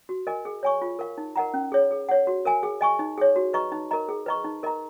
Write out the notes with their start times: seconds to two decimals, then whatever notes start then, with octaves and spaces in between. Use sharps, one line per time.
0.09 F#4
0.27 A#4 D#5 G#5
0.45 G#4
0.63 C#5 G#5 C#6
0.82 F4
0.99 A#4 F5
1.18 D#4
1.36 A#4 D#5 F#5 A#5
1.54 C#4
1.72 G#4 C#5
1.91 G#4
2.09 C#5 F#5
2.27 F#4
2.45 A#4 F5 G#5
2.63 G#4
2.81 D#5 G#5 C#6
2.99 D#4
3.18 G#4 C#5
3.36 F#4
3.53 B4 D#5 A#5 C#6
3.72 D#4
3.91 A#4 D#5 A#5
4.09 G#4
4.26 B4 D#5 A#5 C#6
4.44 D#4
4.63 A#4 D#5 A#5